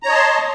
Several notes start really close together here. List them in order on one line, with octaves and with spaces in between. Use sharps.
A#5 C#5 D#5 A5 C6